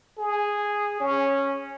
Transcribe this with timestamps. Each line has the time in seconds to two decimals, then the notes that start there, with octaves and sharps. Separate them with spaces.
0.18 G#4
1.00 C#4